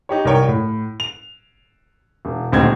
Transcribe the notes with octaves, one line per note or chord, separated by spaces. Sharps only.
D#4 G4 C#5
C2 A#4 C#5 G5
A2
F7
E1
D#1 D2 C4 D#4 G#6